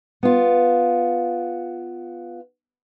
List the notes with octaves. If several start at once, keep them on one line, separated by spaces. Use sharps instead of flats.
B3 F4